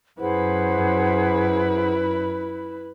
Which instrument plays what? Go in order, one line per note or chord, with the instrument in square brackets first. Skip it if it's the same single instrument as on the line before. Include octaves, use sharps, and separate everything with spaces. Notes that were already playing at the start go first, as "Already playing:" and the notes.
[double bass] F#2 [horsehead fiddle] E4 B4 [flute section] G#4 C5 F#5